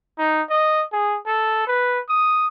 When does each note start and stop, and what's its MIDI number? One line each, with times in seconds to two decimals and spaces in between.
0.18 0.42 63
0.50 0.83 75
0.92 1.18 68
1.26 1.64 69
1.67 2.00 71
2.09 2.47 87